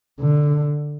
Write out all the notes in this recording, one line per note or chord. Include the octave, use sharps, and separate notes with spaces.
D3